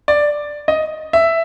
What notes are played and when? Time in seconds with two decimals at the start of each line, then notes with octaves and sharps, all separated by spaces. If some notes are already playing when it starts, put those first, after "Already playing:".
0.08 D5
0.68 D#5
1.13 E5